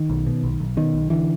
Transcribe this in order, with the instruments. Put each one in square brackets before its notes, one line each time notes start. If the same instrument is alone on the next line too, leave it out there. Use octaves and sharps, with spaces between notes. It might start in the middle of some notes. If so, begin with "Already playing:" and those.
Already playing: [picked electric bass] D#3
B1
B2
B1
B1
B2 D#3
B1
B1 D3 E3